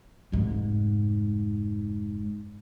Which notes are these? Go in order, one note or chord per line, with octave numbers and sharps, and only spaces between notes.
F1 G#2